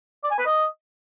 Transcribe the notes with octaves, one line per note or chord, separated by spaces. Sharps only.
D5
G#5
B4
D#5